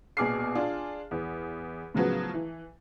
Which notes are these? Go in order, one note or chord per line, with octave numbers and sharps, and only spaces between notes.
A#1 B2 G#4 D6 F6 C7
D4 F4 G#4
E2
A2 C#3 F3 F#3 B3
E3